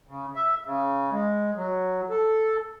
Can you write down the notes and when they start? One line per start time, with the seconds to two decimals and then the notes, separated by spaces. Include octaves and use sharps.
0.07 C#3
0.35 E5
0.65 C#3
1.11 G#3
1.56 F#3
2.10 A4